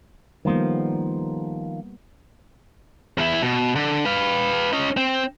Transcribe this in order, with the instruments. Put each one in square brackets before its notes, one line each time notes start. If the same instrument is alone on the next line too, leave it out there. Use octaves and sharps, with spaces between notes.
[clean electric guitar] D#3 F3 [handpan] G3 A#3 B3
[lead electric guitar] E2 E4
B2
D3
B4 F5
C#4 D#5
C4